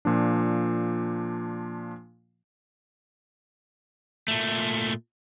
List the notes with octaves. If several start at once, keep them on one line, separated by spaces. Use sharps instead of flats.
A#2 F3 D4
A#2 A3